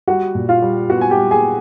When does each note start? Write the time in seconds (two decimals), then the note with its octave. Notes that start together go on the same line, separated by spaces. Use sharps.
0.08 G3 F#4 F#5
0.35 A#2
0.49 F4 F5
0.62 G3
0.90 B3 F#4 F#5
1.01 G#5
1.10 G4 G5
1.17 G3
1.31 G#4 G#5